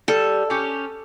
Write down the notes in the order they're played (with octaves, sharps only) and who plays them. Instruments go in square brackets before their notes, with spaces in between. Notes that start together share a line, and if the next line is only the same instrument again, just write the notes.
[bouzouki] G3 [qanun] A4
[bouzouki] C#4 G4